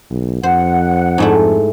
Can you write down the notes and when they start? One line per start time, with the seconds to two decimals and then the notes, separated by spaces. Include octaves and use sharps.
0.11 B1
0.43 F2 C5 F#5
1.18 G#2 A3 E4